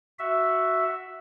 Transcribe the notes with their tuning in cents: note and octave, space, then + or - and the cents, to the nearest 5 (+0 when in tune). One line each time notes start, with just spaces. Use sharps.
F#4 +0 E5 +0